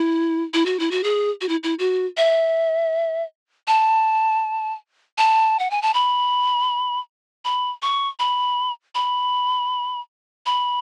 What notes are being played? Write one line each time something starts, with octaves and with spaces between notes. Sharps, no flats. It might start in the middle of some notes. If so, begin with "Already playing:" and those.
Already playing: E4
E4
F#4
E4
F#4
G#4
F#4
E4
E4
F#4
E5
A5
A5
F#5
G#5
A5
B5
B5
C#6
B5
B5
B5